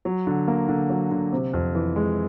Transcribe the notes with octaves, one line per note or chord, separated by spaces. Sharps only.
F#3
D3
A#3
D3
F#3
D3
C3
F2
E3
G#3